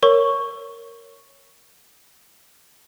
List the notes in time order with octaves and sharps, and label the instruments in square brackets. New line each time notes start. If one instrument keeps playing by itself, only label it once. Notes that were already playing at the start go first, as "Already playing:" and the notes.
[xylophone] A#4 C#5 C#6